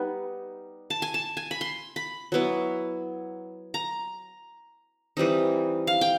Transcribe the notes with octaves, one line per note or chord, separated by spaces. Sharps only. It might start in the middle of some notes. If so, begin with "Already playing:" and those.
Already playing: G3 B3 D#4
A5
G#5
A5
G#5
B5
C6
B5
F#3 B3 E4
A#5
E3 G3 C4 D#4
F5
G5